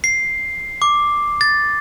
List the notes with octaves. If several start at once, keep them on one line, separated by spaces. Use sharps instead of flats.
C7
D6
A6